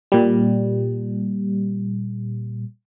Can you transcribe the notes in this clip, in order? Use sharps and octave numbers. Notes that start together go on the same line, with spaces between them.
A#2 G3